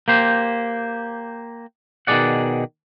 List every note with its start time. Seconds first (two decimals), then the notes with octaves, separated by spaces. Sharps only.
0.08 A#3 G4 C5
2.07 B2 D#3 A3 G#4 D5 F#5